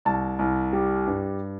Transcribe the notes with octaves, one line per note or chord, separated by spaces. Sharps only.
C2 A5
C2
G3
G2